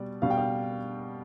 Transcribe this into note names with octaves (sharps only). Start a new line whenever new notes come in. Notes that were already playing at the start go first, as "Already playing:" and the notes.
Already playing: B2 G3 D5
B2 G3 F5
G5
F5